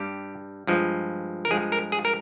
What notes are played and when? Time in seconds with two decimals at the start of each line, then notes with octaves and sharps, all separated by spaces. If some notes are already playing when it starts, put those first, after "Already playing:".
Already playing: G2 G3 G4
0.67 G2 F3 G#3
1.45 A#4
1.50 G2 F3 G#3 G#4
1.72 A#4
1.92 G#4
2.05 A#4